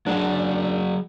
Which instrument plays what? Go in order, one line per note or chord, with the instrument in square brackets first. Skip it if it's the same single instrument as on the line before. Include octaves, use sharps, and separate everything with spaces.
[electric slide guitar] F#3 F#4 G#4 [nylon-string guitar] G#3 D4